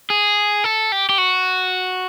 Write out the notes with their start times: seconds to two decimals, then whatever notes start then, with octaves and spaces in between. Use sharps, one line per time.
0.10 G#4
0.64 A4
0.92 G4
1.09 G4
1.18 F#4